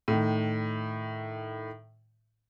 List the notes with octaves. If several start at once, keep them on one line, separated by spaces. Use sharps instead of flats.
A2 D#3